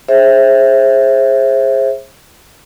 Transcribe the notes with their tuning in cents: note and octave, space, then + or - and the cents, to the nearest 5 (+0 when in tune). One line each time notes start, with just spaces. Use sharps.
G#4 +0 C5 +30 E5 +0